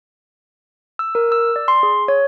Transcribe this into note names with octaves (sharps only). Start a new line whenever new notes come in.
E6
A#4
E6
D5
C6
G#4
C#5